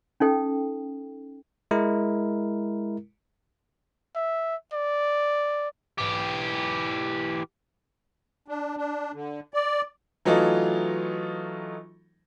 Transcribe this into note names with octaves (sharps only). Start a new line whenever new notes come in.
C#4 D#4 A4 G5
G#3 E4 A#4
E5
D5
E3 G4
D4
D4
D3
D5
E3 F#3 A3 D#4 F4 A4